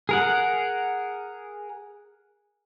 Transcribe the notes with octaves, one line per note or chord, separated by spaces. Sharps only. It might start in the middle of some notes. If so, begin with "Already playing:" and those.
G#4 A#4 F#5